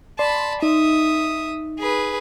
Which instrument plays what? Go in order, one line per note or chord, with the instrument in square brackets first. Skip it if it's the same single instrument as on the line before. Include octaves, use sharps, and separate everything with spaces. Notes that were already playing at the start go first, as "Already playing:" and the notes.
[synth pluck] D5 C6 [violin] A5 B5
[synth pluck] D#4 [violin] E5 D#6
[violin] G#4 B4